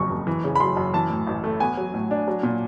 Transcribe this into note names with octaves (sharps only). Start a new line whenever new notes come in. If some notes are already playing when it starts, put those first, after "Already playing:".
Already playing: F#1 F2 C#3 C#6
F#1
E3
C#3
B5
F#2 C6
F#2
E3 A5
A2
A1
A3
B3 G#5
F#3
A2
D4
F#3
A#2